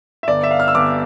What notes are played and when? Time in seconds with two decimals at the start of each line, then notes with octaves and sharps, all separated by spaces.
0.23 E5
0.28 G1 D5
0.43 E5
0.51 F5
0.60 F6
0.68 E6
0.75 G1 D6